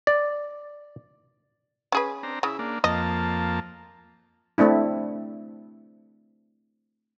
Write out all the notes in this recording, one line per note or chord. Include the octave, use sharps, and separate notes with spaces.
D5
C#4 G#4 B4
C4 D4 A#5
C#3 E4
A#3 D4
F2 A#3 D#5 A5
A3 C4 D4 E4